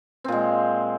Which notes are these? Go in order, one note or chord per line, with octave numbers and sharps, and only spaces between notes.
A#2 G#3 C4